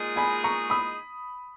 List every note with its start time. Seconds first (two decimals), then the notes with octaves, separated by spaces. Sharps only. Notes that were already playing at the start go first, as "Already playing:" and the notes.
Already playing: A#2 G#3 D#4 G#4
0.16 G#5 B5
0.44 A#5 C#6
0.70 B5 D#6